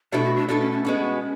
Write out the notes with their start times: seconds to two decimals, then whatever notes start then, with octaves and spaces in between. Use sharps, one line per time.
0.12 B2 A3 D4 E4 A4
0.24 F#4
0.36 D4
0.48 B2 A3 D4 E4 A4
0.60 C#4
0.72 C#4
0.85 G#3 B3 F#4